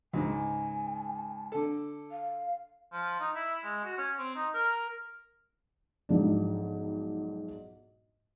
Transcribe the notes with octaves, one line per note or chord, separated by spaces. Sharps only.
C#2 G#2 G#5
D3 A4
F5
F3
D#4
E4
G#3
F#4
C#4
C4
D#4
A#4
B1 G#2 F3 D4